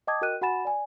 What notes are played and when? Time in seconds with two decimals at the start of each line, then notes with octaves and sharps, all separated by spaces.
0.07 D#5 G5 A5 D6 D#6 G#6
0.21 F#4 A#4 D#5 G5 F#6 D#7
0.42 F#4 F#5 G#5 B5 A6 E7
0.65 D5 G#5